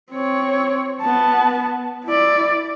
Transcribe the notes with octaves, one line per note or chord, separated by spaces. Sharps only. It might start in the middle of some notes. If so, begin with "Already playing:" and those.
C4 C#5
B3 A5
E4 D5